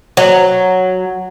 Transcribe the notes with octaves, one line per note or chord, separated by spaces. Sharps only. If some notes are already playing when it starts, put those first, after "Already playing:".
F#3